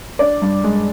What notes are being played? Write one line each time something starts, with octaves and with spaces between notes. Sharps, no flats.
D4 D5
G2
G#3